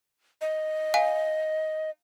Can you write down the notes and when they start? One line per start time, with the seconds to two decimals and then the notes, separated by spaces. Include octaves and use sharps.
0.41 D#5
0.94 F5 G#5